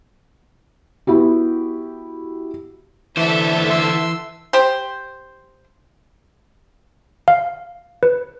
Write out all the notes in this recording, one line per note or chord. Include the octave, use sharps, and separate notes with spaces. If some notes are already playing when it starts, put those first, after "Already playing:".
B3 E4 F#4 G4
D3 E3 A4 C5 E5 A5
C6 E6
G4 C5
F5
B4